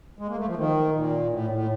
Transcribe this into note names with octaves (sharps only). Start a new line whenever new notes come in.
G#3
A#3
A3
F3
D#3
A#2
A2
A2